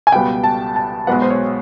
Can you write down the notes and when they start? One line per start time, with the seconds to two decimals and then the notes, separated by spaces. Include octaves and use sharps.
0.07 G#5
0.12 C#2 B2 G3 B3 G5
0.44 A5
0.76 A5
1.07 B1 B2 G#3 B3 F#5
1.22 C5
1.30 C#5